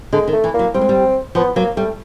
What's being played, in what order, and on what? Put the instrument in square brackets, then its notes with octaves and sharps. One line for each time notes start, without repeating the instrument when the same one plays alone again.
[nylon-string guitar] D3 [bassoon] G#3
[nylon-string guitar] D#3
[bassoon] A3
[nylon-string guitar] E3
[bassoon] A#3
[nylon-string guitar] F#3
[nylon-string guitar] G3 [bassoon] C4
[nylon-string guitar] G#3
G3
[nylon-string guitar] F3 [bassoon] B3
[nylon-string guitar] F#3 [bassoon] A#3
[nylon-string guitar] G3 [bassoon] A3